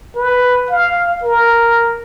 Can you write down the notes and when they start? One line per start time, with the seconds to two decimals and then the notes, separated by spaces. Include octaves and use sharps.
0.16 B4
0.71 F5
1.24 A#4